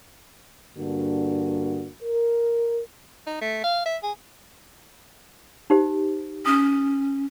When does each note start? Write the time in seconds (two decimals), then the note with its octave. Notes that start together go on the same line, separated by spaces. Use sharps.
0.77 G2 D3 A#3 D4 F#4
2.02 A#4
3.27 D#4
3.41 A3
3.64 F5
3.86 E5
4.03 G#4
5.70 D#4 G4 C5
6.46 C#4 D#6